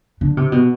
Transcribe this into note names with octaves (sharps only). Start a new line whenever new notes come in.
D3
C3
B2